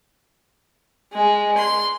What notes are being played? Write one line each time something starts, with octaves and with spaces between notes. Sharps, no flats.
G#3
C6